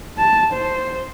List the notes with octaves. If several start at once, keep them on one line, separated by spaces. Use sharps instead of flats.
A5
C5